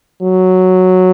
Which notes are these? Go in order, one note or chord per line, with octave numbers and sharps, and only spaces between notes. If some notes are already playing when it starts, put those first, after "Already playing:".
F#3